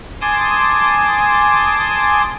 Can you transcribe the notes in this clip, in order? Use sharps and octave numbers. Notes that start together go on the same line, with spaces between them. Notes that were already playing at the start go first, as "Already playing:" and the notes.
G#5 A5 C6 D6 D#6